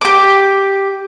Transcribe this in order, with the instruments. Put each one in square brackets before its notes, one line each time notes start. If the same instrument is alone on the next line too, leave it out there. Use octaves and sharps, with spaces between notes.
[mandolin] G4 D6